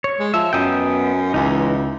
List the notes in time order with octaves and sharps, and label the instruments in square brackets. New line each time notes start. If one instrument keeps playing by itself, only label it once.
[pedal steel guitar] C#5
[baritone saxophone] G#3
[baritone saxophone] F3 [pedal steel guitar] E5
[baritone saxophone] F#2 [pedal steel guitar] B3 D#5 G5
[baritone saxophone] C#2 [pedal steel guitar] E3 D#4